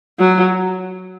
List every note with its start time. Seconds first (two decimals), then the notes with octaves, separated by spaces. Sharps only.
0.19 F#3